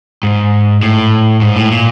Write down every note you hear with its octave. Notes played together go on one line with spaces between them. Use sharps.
G#2
A2
G#2
A2
A#2